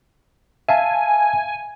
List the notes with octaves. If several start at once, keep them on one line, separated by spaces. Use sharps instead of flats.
E5 F5 G#5 A5